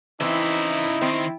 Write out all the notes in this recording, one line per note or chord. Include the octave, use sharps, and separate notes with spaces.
C#3 E3 C4 D#4 E4 E5
D#3 C4